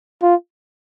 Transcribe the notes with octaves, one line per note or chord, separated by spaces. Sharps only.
F4